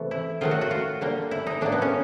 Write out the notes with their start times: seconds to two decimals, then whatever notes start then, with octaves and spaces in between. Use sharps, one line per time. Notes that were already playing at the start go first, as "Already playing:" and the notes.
Already playing: C3 E3 A3
0.11 E4
0.41 D#3 F#3 A3 F4
0.51 F#4
0.61 F#4
0.71 F4
1.01 D3 G3 A#3
1.31 E4
1.47 D#4
1.61 A2 F#3 A#3 D4
1.72 B3
1.82 C#4